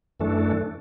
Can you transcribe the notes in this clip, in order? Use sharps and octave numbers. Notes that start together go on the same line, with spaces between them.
F#2 E3 A3 D4 A4